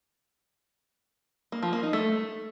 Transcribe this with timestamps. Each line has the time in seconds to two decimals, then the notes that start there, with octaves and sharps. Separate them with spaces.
1.52 A#3
1.63 F3
1.73 A#3
1.83 D#4
1.93 A3